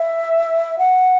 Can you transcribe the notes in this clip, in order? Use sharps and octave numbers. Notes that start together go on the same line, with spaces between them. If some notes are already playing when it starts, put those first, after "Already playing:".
Already playing: E5
F#5